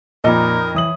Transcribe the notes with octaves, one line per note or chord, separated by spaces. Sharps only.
F2 A#2 D#4 A#4 D#5 A#5 B5
E3 C#5 E5 D#6 F#7